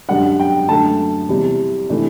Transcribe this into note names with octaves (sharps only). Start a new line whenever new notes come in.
F#2 D3 G3 D4 F#5
G5
F#2 D3 A3 A5
E2 C3 G3
C3 E3 A3 D4